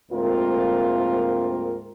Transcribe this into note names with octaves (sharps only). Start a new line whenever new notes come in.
D2 G#2 A#3 C4 F4 A#4